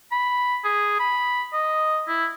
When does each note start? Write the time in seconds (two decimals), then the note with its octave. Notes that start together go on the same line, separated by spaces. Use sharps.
0.12 B5
0.64 G#4
1.00 B5
1.54 D#5
2.08 E4